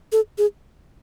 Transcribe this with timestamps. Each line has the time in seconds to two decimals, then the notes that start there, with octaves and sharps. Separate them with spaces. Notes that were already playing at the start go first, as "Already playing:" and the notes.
0.12 A4
0.38 G#4